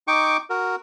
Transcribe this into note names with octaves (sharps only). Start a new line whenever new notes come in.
D#4 G5 C#6 D6
F#4 A#4